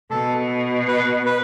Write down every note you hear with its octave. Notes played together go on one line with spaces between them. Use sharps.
B2 A4
B4
B4